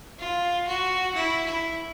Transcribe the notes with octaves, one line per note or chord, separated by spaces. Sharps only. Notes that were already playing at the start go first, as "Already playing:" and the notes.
F4
F#4
E4
E4